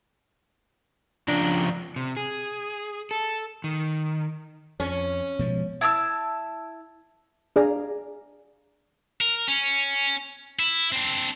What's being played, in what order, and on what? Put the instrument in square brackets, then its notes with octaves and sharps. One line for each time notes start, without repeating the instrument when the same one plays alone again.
[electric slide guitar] C#3 F3 A#5 [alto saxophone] D4
[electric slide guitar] C3
G#4
A4
D#3
[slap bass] F2 [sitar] C#4
[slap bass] B2 F3 G#3
[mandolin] E4 A5 D6 E6
[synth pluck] D4 G#4 D5 F5 G#5 A#5
[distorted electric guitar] A#4
C#4
E4
C4 D4